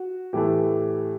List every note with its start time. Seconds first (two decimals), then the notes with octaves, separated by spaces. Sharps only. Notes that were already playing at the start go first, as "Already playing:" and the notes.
Already playing: F#4
0.33 A2 E3 A3 G4